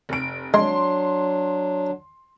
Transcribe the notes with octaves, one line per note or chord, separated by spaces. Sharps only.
F1 D7
F#3 G#3 D4 C6